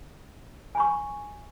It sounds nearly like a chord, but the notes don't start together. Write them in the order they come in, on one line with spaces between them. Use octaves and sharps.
G#5 B5 C#6